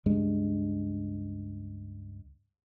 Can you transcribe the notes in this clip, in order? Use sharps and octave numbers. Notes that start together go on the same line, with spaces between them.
C#2 G2 G#3 D4